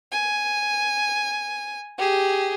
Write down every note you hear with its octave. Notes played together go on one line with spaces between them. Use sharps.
G#5
G4 G#4